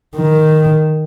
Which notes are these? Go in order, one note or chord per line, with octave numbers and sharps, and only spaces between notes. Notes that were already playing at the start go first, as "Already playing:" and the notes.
D#3